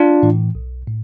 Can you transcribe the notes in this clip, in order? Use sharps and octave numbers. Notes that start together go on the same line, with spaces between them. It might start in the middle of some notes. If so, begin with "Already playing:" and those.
Already playing: D4 F4
A2 E3
B1
A2